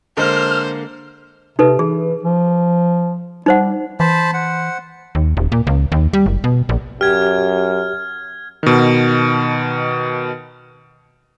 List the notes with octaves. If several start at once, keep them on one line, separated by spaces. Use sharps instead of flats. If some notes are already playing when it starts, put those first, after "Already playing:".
D3 G#3 A#3 C5 F6
C3 D#4 A4 B4
E3 G#4
F3
G3 D#4 C5 F#5
E3 C5 A5 B5
C5 F#5
D#2
D#1
A#2
C#2
D#2
G3
F#1
B2
A#1
F#2 G4 F6 G#6
B2 D#3